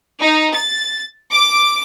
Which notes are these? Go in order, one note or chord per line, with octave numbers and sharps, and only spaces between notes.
D#4
A6
D6